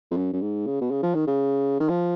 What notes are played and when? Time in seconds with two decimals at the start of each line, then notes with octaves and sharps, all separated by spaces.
0.11 F2
0.17 F#2
0.33 F#2
0.42 G#2
0.66 C#3
0.81 B2
0.91 C#3
1.03 F3
1.15 D#3
1.27 C#3
1.80 D#3
1.89 F3